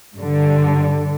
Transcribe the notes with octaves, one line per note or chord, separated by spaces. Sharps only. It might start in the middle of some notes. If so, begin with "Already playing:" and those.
G2 D3